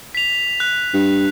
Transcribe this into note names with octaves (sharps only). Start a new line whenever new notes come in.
B6 F7
F#6
G2